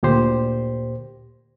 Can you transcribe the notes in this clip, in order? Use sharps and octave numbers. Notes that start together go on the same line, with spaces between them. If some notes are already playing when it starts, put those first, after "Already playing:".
D2 A#2 G4 C5